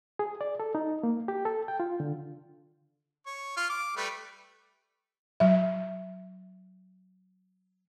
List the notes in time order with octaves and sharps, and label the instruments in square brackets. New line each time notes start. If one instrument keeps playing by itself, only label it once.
[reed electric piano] G#4
D5
A4
D#4
A#3
G4
A4
G5
F4
D3
[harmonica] C#5
F4 F6
D6
G3 A3 B4
[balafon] F#3 E5